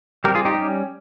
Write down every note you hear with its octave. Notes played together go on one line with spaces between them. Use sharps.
G3 C4 G4 A#4
F4 G#4
D#4 G4
G3 C#4